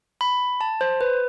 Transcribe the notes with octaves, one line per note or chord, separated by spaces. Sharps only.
B5
A5
C5
B4